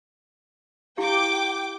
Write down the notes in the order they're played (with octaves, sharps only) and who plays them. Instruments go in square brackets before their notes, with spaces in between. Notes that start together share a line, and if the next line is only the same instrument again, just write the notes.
[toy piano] E4 G4 F5 [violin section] G5 D6